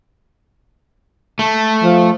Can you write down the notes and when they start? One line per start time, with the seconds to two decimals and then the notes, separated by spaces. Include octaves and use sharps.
1.39 A3
1.83 F3